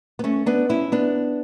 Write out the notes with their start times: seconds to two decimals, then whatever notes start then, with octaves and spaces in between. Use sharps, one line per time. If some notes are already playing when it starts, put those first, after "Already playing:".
0.19 B3
0.24 A3 C#4
0.46 B3 D4
0.69 C#4 E4
0.92 B3 D4